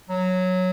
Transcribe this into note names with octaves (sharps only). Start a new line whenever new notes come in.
F#3